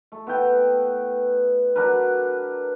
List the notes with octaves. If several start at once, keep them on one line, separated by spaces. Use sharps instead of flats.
A3
B3 E4 G5
F#3 D4 A#4 B4